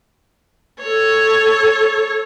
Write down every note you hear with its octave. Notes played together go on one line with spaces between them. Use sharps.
A4 C#5